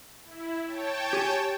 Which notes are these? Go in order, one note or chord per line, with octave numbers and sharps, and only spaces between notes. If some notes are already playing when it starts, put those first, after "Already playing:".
E4
C#5 G5 A5
G4 G#5